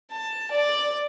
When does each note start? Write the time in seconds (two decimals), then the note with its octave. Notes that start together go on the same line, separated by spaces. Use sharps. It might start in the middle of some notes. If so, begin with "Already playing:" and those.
0.11 A5
0.51 D5